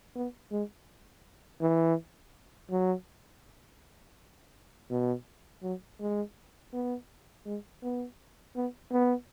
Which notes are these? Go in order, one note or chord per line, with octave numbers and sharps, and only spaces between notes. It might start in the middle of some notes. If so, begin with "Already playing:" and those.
B3
G#3
E3
F#3
B2
F#3
G#3
B3
G#3
B3
B3
B3